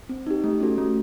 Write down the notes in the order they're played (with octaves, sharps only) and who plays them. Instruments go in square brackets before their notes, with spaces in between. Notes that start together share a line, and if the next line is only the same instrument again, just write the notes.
[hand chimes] C4
D#4 G4
A3
C#4 F#4 A4
A3